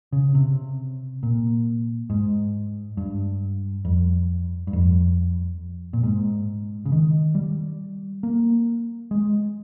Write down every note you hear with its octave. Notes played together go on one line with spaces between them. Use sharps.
C#3
C3
A#2
G#2
G2
F2
G2
F2
A#2
G#2
C#3
D#3
G3
A#3
G#3